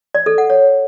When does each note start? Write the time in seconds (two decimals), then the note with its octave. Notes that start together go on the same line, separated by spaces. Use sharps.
0.15 D5
0.26 A4
0.38 F#5
0.50 C#5